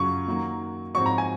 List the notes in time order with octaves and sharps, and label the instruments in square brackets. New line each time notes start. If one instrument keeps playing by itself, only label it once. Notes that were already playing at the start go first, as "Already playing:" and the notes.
Already playing: [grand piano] F#2 C#3 F#3 C#4 F4 [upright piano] C#6
[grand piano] D#3 F#3 A#3
[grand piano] G#2 F3 C4 F#4 C#5 [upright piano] C#6
[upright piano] A#5
G#5